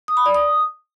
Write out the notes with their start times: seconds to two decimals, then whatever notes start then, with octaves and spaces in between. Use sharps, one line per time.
0.08 D#6
0.17 B5
0.26 D5
0.35 D#6